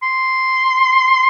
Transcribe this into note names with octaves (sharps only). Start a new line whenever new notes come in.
C6